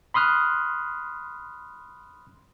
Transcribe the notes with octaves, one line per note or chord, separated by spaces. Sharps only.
B5 C6 D#6 F6 F#6